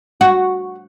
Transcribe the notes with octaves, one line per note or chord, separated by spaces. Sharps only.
F#4